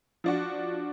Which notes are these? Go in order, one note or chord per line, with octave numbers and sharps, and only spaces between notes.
F3 D4 F#4